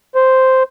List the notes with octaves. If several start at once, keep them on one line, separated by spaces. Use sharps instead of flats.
C5